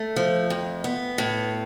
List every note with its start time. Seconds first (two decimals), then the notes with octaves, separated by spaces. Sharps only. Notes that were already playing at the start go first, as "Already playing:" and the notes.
Already playing: A3
0.16 F3
0.50 F2
0.84 B3
1.18 A2